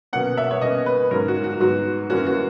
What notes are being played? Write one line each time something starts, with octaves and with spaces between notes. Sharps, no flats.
B2 F#3 A#3 C#4 F#5
E5
C#5
B2 A#3 C#4 D#5
B4
G#2 F#3 C#4 A#4
F#4
F#4
G#2 F#3 B3 F#4
F#2 E3 A#3 C#4 F#4
F#4